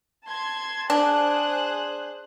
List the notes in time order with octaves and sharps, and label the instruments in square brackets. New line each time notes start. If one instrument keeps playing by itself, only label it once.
[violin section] A5 C6 G#6
[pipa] D4 [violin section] G#4 C5 F#6